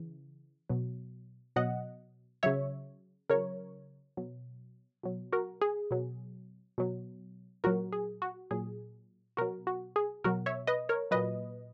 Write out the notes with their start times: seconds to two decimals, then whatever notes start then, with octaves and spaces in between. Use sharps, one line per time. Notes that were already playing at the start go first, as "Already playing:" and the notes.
Already playing: C#3 E3
0.69 B2 F#3
1.56 B2 F#3 D#5 F#5
2.43 C#3 F#3 C#5 E5
3.30 C#3 F#3 A#4 C#5
4.17 B2 F#3
5.03 B2 F#3
5.32 F#4 A#4
5.61 G#4
5.91 B2 F#3
6.78 B2 F#3
7.64 A#2 F#3 F#4 A#4
7.92 G#4
8.22 F#4
8.51 A#2 F#3 G#4
9.37 B2 F#3 F#4 A#4
9.67 F#4
9.96 G#4
10.24 B2 F#3 F#4 A#4
10.46 C#5 E5
10.67 B4 D#5
10.89 A#4 C#5
11.11 A#2 F#3 B4 D#5